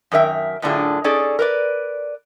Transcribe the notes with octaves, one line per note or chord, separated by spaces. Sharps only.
F#2 D#3 A#4 E5 G5
F#2 A2 D3 D4 F4 G#4
C#4 D#4 G#4 A4 D5
A#4 B4 D5